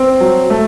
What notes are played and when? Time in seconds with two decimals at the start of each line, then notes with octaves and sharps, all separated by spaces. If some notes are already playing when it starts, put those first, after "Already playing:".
Already playing: C4
0.21 F#3
0.50 A3